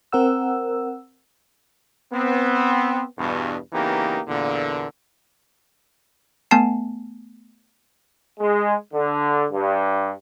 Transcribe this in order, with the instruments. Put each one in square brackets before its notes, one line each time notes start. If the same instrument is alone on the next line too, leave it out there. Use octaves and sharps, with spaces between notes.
[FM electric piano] C4 A#4 F#5 E6
[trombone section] B3 C4
E2 G2 B2
C#3 E3 A#3 B3 D#4 G4
E2 A#2 D3
[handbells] A3 B3 G#5 A5 C7
[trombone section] G#3
D3
G2